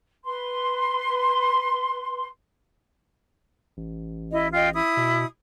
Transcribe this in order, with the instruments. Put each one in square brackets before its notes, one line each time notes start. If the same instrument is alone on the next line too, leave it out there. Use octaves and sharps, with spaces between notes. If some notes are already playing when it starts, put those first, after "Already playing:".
[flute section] B4 C6
[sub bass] A1
[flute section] E4 D#5
F4 D#5 G5
E4 D#6
[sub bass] B2